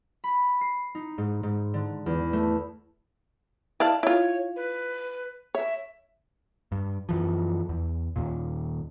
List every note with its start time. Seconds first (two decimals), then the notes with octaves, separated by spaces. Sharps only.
0.24 B5
0.61 C7
0.95 D#4
1.18 G#2
1.43 G#2
1.74 D3
2.06 E2
2.33 A3
3.80 E4 D5 F5 A5
4.03 E4 F4 C#5
4.56 B4
5.55 C#5 E5
6.72 G2
7.09 F#2 E3 F3
7.69 E2
8.16 D#2 A#2